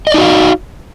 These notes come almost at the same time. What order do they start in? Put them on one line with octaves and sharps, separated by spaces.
D#5 D5 D#4 F#4 F5